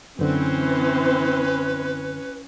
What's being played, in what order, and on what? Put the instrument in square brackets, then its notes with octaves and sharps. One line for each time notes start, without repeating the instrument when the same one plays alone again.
[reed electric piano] F#2 D3 [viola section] E3 C4 C5 [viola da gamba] C#4 [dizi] B4